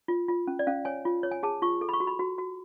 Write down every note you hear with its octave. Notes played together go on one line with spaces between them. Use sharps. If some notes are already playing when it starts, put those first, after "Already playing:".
F4
F4
C#4
D5
C#4 F5
C#5 G#5
F4
C#5
G#5
G#4 A5
F4 C#6
A4
B5
C#6
F#4
B5
F#4
F#4